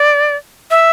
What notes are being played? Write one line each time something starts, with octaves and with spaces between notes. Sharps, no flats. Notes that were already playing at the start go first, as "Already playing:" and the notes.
Already playing: D5
E5